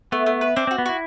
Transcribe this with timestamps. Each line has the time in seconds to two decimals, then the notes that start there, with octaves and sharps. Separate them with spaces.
0.12 A3 B3
0.26 A3
0.41 B4
0.56 C4 D4
0.67 C4 F#4
0.78 B3
0.86 E4 F#4